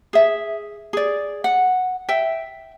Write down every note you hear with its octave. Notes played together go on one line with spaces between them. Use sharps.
G#4 E5
G#4 D5
F#5
E5 G5